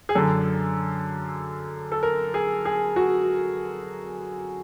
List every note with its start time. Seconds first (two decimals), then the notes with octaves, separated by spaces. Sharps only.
0.09 G#4
0.15 F#2 D3 A4
1.92 A4
2.03 A#4
2.34 G#4
2.65 G#4
2.96 F#4